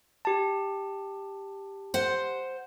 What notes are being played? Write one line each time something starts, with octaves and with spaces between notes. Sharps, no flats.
G4 A5
C5 F#5